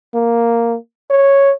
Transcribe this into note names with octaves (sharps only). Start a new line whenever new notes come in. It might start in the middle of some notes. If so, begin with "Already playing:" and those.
A#3
C#5